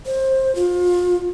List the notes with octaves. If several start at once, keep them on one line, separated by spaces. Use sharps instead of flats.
C5
F4